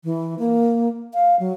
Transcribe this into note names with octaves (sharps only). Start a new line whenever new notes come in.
E3
A#3
F5
F#3